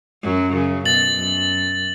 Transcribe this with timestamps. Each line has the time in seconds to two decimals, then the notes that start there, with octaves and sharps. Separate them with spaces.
0.23 F#2 F#3
0.54 C#3
0.85 B2 A6 F#7
1.17 F#2